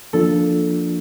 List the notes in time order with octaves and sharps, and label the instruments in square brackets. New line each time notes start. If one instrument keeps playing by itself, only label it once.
[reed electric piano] F3 A#3 D4 F4 [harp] A4